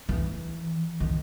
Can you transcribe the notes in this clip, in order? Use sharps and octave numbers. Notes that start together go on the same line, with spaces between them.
E3
D#3